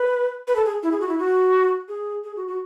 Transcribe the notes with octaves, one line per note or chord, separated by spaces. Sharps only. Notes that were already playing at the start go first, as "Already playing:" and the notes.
Already playing: B4
B4
A4
G#4
E4
G#4
F#4
E4
F#4
G#4
G#4
F#4
F#4